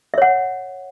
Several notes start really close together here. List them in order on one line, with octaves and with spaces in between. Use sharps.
E5 C#5 F#5